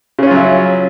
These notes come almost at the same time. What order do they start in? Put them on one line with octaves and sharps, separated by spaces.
C#3 C#4 F4 F#3 E4